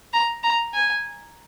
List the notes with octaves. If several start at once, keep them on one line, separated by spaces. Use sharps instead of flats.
A#5
A#5
G#5